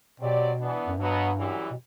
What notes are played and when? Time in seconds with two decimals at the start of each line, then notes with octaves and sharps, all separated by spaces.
0.19 B2 F#3 C4 G4 D5
0.59 E3 B3 D4
0.88 F#2
0.97 G2 B2 F#3 B3
1.37 F#2 E3 G3
1.71 B2